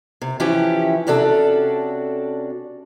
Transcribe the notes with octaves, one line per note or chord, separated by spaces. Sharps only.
C3
E3 F3 C#4 E4 G4
C3 C#4 D4 F#4 A4